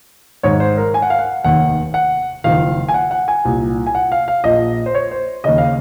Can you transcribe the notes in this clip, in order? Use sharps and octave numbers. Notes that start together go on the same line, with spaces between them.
G#1 G#2 D#3 C#5
C5
A#4
G#5
F#5
F5
F#5
F1 D#2 D#3 F#5
F#5
F#1 F2 D#3 F5
G#5
F#5
F#5
G#5
C2 A#2
G#5
F#5
F5
F5
A#1 A#2 D#5
C5
C#5
C5
D#2 C#3 D#5
F5